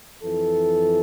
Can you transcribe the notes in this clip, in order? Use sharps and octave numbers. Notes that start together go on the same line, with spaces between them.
F2 E3 A4